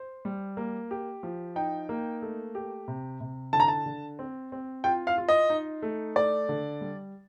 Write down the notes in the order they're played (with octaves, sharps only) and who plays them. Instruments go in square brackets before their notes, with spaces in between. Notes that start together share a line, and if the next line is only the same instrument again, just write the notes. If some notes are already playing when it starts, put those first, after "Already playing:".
Already playing: [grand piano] C5
G3
A#3
G4
F3
[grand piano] D#4 [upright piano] G5
[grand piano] A#3
A3
G4
C3
C3
[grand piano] D3 [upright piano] A5
[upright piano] A#5
A5
[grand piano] D3
C4
C4
[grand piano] F4 [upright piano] G5
[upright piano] F5
[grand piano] F4
[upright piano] D#5
[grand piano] D#4
A3
[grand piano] A3 [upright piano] D5
[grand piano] D3
G3